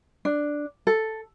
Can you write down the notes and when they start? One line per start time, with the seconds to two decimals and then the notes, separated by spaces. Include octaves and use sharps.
0.25 D4
0.87 A4